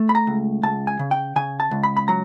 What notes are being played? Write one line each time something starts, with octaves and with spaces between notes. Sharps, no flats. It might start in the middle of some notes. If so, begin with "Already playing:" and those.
Already playing: A3
B5
A#5
C#2
C#2 A5
G#5
C#3
G5
C#3 G#5
A5
C#2
B5
B5
F#3 A#5